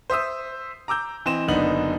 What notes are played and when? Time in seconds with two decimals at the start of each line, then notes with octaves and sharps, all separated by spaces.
0.10 C5 E5 D#6 E6
0.88 A#5 D6 E6 G6
1.26 E3 C4 D#5 E7
1.48 F#1 D3 B3 D4 D#4 F#7